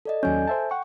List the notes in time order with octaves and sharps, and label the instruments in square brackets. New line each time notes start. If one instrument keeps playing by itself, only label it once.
[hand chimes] A4 D5 D#5
[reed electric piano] D#2 F#3 C#4 [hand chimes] A4 G#5 G6
[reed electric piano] C5 E5 A5
F#5 G5 C#6